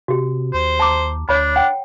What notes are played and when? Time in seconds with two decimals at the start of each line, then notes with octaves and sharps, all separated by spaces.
0.08 C3 F#4 G4
0.54 D#2 C5
0.80 A5 A#5 D6
1.29 D2 D4 C#5 B5
1.56 F#5 G5